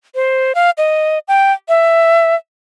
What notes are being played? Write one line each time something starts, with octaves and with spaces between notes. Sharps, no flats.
C5
F5
D#5
G5
E5